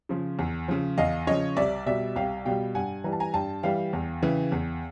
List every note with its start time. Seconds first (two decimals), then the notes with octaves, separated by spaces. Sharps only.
0.09 C#3 F3
0.39 E2
0.68 C#3 F3
0.98 E2 D#5 F5
1.27 C#3 F3 C#5 D#5
1.57 C2 D5 E5
1.86 B2 G3 D5 E5
2.16 C2 F5 G5
2.45 B2 G3 F5 G5
2.75 G2 F#5 G#5
3.04 E3 G3 A#5
3.12 A5
3.20 G#5 A#5
3.34 G2 G5 A5
3.63 E3 G3 F5 G5
3.93 E2
4.22 C#3 E3
4.52 E2